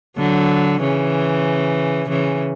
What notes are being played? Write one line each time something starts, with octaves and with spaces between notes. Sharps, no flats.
D3 F#3
C#3 E3
C#3 E3